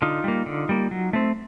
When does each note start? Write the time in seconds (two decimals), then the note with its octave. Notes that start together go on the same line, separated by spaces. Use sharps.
0.02 D3 D#4 F4
0.24 G3 A#3
0.46 D3
0.69 G3 A#3
0.91 F#3
1.13 A3 C4